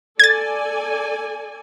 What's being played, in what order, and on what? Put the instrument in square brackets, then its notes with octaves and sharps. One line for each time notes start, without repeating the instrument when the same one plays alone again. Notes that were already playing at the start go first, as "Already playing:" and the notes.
[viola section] A4 D5 G#5 [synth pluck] G#6 A6